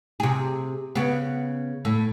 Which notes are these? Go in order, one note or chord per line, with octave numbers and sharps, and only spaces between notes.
C3 G#4
C#3 B3
A2 A4